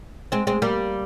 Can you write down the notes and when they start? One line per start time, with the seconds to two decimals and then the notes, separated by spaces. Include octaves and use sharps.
0.32 G#3 C4
0.47 G#3 C4
0.62 G3 A#3